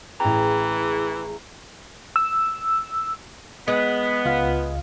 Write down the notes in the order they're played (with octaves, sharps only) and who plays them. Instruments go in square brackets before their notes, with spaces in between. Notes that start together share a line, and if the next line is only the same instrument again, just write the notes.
[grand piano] A1 G5 [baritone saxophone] E3 [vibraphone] G#4 [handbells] A#5
[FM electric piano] E6
[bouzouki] G#3 [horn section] B3
[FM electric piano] C#2 F4 F5